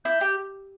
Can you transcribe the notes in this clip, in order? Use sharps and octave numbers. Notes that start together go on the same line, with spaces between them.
E4 G6
G4